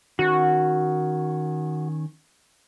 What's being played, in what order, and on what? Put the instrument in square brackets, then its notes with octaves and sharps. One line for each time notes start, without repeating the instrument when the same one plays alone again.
[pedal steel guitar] D#3 C#4 [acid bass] F#4